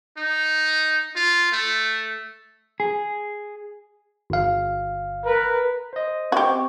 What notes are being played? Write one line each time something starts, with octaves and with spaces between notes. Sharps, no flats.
D#4
F4
A3
G#4
G1 F5
A#4 B4
C5 D#5
C4 F#4 G4 C#6